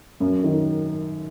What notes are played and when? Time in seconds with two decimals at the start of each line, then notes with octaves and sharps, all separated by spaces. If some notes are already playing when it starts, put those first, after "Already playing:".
0.20 F#2
0.44 D#3